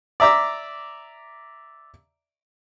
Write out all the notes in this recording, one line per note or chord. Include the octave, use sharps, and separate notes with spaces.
D5 E5 A#5 D6 E6